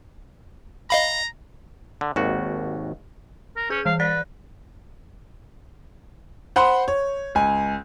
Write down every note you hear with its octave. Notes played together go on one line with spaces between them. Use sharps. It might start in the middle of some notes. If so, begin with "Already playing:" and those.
D#5 F5 A#5 B5
D3
G#1 D#2 F#4
A#4
C#4 G#4 G6
E3 F5
B4 D5 A6 B6
C5 F#5 B5 C6
C#5
C#2 G#5